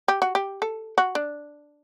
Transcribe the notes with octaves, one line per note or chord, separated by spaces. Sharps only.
G4
F#4
G4
A4
F#4
D4